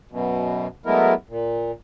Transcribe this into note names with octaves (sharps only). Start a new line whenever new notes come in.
F#2 B2
F#3 G#3 A3 B3 E4 A#4
A#2